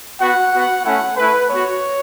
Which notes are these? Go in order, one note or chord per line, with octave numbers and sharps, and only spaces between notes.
B3 F#4 F#5
B3 F#4
A3 C#4 E4 F#5
A3 E4 B4
B3 F#4 C#5